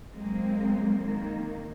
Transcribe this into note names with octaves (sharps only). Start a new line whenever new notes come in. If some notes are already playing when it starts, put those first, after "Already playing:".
F#3 G#3 A#3 C4
D#3 A#3